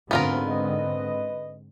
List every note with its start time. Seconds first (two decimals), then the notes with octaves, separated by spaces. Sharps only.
0.11 D2 G#2 D3 B3 C4 F4 A#4
0.49 B4 D#5